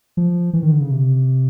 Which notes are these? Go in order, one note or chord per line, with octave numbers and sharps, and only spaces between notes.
F3
E3
D#3
D3
C#3
C3